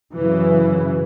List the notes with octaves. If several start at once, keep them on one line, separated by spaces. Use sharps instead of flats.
F#2 C#3 E3